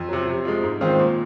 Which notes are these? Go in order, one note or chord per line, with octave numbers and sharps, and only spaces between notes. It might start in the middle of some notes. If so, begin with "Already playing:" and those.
Already playing: F2
C3 F#3
C3
F3 G#3
G#2
D#3 G#3 C4 F4
A#2